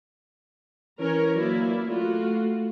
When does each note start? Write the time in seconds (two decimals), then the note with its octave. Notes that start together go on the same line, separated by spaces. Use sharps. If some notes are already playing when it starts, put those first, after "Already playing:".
0.99 E3 C#4 A#4 C#5
1.35 F#3 A#3 E4 D5
1.87 A3 F4 F#4